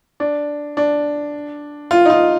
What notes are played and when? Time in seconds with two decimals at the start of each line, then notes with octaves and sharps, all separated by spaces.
0.20 D4
0.77 D4
1.91 F4
2.05 D#4
2.10 F4